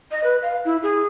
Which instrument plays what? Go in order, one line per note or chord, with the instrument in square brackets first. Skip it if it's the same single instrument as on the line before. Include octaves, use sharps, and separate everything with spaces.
[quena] D#5
B4
F5
E4
G#4